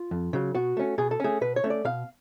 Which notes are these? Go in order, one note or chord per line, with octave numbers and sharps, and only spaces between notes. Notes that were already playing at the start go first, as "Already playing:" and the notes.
Already playing: F4
F2
C#3 F#3
B2 F#4
A3 C#4
B2 G#4
A4
A3 C#4 G#4
B2 B4
C#5
A3 C#4
D5
B2 F5